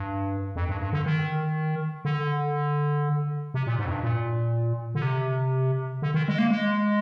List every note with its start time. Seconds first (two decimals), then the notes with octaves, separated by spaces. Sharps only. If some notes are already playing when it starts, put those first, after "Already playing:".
Already playing: G2
0.56 F2
0.69 G2
0.81 G2
0.93 D3
1.06 D#3
2.05 D3
3.54 C3
3.67 A#2
3.79 G#2
3.85 F2
3.91 G2
4.03 A#2
4.95 D3
5.02 C3
6.02 D3
6.14 D#3
6.28 G#3
6.38 A#3
6.51 G#3